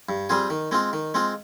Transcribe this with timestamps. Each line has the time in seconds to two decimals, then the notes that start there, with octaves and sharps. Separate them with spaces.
0.09 G2
0.29 G3 C4 F4 G#4
0.50 D#3
0.71 G#3 C4 F4
0.93 D#3
1.14 G#3 C4 F4